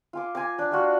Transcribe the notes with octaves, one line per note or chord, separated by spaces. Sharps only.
F4 G#5 D6
G#5 A#5 C6 D6
D4 D5
G3 F4 F#4